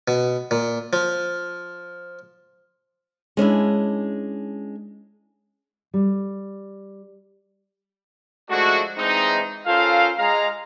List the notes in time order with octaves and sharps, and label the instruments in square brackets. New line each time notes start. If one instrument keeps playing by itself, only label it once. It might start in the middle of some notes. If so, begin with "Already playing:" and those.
[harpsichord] B2
A#2
F3
[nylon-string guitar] G#3 C#4 D4 E4
G3
[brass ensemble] F3 G#3 A3 D4 E4 F#4
E3 G#3 C4 D4 D#4
C#4 F4 A4 A#4 C5 F5
G#3 F5 A#5